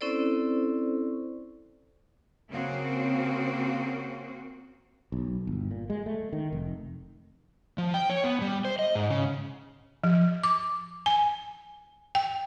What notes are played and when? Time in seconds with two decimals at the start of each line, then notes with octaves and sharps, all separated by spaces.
0.01 C4 C#4 E4 A4 C5 D5
2.51 C#3 A#3 C4 F#4
5.12 B1
5.47 G1
5.71 A#2
5.90 G#3
6.06 A3
6.33 D#3
6.52 F1
7.78 F3
7.94 G5
8.10 C#5
8.24 B3
8.41 G3
8.65 C5
8.79 D#5
8.95 G#2
9.10 C#3
10.04 F3
10.43 D6
11.06 G#5
12.15 G5